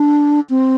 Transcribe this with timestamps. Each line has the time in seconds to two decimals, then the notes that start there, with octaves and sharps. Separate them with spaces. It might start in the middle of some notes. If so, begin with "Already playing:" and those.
Already playing: D4
0.50 C4